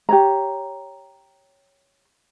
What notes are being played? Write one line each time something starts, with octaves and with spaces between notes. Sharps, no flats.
G4 C#5 A#5